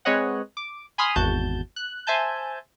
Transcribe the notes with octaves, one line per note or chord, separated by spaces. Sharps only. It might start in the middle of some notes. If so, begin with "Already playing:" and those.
G#3 C4 B4 C#5 D#5 F#5
D6
G#5 B5 C6 D#6 F6
G#1 E2 F#4 A5 G6
F#6
C5 E5 G#5 A5 G6